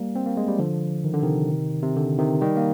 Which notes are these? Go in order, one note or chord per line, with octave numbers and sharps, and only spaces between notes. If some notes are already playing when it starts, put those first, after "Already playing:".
Already playing: G3 A#3
C4
A#3
G#3
G3
D3 F3
D#3
D3
C3 D#3
C3
D3
C3 D#3
D#3 G3
A#3